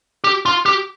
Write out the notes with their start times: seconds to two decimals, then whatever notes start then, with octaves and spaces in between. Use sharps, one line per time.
0.24 G4
0.46 F4
0.66 G4